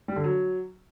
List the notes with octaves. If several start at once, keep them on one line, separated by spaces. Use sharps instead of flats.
G3
D3
F#3